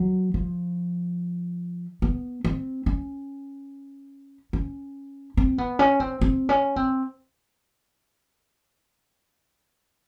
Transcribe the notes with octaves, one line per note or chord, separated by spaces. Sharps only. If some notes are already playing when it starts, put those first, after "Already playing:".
Already playing: F#3
F3
B3
C4
C#4
C#4
C4
B3
C#4
C4
C4
C#4
C4